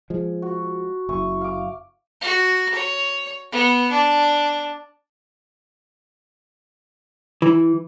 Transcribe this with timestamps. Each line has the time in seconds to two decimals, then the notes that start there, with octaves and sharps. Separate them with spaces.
0.10 F3 G#3
0.42 F#4
1.09 F#1 E4 C#6 D#6
1.41 F5 D6
2.21 F#4
2.74 C#5
3.52 B3
3.91 D4
7.42 E3